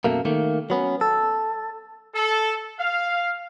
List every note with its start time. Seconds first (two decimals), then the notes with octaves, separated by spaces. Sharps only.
0.04 F#2 B2 A3 A#3
0.25 D#3 A3 A#3
0.70 F#3 B3 C#4
1.01 A4
2.14 A4
2.79 F5